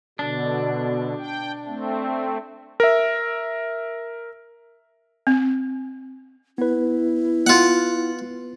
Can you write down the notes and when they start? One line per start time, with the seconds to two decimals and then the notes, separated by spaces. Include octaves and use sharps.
0.19 B2 D3 D4
1.19 G5
1.66 A3 C4
2.80 A#4 E5
5.27 C4
6.58 B3 E4 B4
7.47 F4 F#5